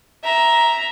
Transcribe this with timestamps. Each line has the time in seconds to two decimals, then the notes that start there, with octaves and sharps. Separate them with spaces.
0.24 E5 A#5